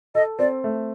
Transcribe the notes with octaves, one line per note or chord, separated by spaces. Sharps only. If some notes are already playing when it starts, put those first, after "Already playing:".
A4 D#5
C4 D5
A3